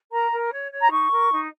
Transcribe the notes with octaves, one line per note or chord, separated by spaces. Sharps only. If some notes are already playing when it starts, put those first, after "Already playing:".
A#4 A#5
A#4
C#5
C#5
A#5
D#4 C#6
A#4
D#4